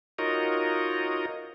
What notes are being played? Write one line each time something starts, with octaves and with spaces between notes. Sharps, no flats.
D#4 F4 F#4 A#4 C#5 D#5